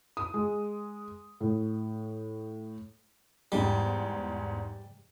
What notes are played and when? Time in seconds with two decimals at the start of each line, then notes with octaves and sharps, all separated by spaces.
0.17 D#6
0.34 G#3
1.41 A2
3.52 E2 G#2 G3